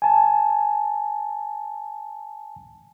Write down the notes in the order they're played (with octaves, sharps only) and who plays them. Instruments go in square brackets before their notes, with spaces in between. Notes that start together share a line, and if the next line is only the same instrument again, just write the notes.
[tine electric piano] G#5 A5